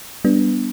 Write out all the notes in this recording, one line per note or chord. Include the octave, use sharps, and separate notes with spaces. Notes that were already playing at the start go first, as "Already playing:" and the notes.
G3 B3 D4